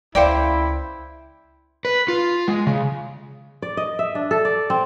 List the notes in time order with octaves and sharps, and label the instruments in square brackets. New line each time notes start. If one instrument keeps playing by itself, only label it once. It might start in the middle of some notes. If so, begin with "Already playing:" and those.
[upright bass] C#2 [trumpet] E4 [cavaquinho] C5 G5 D6 [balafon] D5 F5
[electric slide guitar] B4
F4
G#3
C#3
[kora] D5
D#5
E5
D4
A4
D5
C4